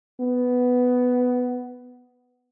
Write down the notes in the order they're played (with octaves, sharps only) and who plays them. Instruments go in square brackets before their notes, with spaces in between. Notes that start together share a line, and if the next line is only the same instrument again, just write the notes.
[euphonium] B3